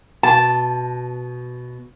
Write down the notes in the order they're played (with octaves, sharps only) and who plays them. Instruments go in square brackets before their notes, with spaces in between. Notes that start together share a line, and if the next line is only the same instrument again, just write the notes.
[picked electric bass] B2 [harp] A5